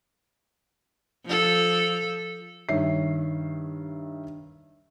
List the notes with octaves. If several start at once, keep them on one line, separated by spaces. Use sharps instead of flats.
F3 A4
G2 D#3 C#5 E5 C7